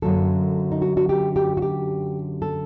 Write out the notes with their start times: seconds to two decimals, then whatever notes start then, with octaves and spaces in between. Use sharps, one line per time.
0.02 F#2 D3 F#3 A#3 A4
0.72 D#4
0.82 F#4
0.97 F#4
1.09 G4
1.36 G4
1.57 F#4
1.62 G4
2.42 A4